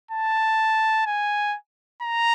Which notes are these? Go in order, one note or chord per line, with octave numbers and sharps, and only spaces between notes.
A5
G#5
A#5